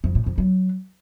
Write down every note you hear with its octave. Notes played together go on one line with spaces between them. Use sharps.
F2
A2
F2
F#3